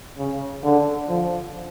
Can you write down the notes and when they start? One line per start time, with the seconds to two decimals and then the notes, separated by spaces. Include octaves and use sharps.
0.18 C#3
0.63 D3
1.09 F3